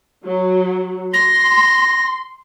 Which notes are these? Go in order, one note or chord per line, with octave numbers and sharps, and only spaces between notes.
F#3
C6 A#6